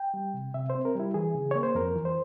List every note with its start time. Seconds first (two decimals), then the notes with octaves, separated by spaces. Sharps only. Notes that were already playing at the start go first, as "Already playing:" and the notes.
Already playing: G5
0.14 G3
0.34 C3
0.54 C3 E5
0.70 C5
0.75 C4
0.85 A#4
0.95 G3 E4
1.14 E3 G#4
1.34 C#3
1.51 A#3 C#5
1.63 C5
1.75 F2 A#4
1.95 E3
2.05 C5